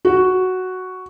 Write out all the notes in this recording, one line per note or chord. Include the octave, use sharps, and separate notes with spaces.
F#4